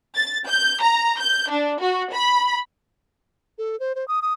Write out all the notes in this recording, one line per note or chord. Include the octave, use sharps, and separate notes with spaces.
A6
G6
A#5
G6
D4
F#4
B5
A4
C5
C5
D#6
D#6